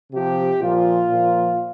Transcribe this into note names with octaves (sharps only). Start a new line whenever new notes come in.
C3 F3 G4
A#2 F3 F4
A#2 F3